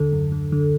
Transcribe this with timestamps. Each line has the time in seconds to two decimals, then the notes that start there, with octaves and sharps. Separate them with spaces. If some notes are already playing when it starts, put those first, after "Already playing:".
Already playing: D#2 D3 A4
0.12 F#2
0.32 D3
0.52 D3